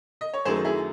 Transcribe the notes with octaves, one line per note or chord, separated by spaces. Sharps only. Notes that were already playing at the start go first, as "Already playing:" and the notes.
D#5
C#5
F#2 D#3 F#3 A3 G#4 C5
E4 G#4